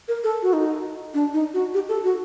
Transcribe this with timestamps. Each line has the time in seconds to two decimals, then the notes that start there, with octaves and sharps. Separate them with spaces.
0.08 A#4
0.24 A4
0.42 F#4
0.53 D#4
1.14 D4
1.33 D#4
1.54 F#4
1.74 G4
1.89 A4
2.04 F#4